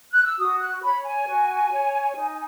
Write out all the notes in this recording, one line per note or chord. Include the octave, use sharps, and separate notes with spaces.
F#6
E6
F#4 D#6
F#6
C#5 B5
G#5
F#4
C#5
D#4